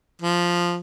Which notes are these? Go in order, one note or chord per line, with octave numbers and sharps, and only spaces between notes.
F3